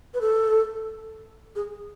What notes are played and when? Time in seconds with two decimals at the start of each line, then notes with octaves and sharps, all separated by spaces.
0.14 B4
0.21 A4
1.56 G#4